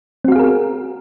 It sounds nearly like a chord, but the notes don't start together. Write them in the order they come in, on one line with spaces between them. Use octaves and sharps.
C4 F#4 F5 G#4 A#4